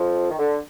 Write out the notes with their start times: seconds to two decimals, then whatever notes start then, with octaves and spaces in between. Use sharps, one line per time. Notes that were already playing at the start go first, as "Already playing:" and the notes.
Already playing: F2 F3
0.31 D#3
0.39 D3